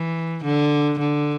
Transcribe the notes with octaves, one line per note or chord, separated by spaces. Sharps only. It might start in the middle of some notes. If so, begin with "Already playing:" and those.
Already playing: E3
D3
D3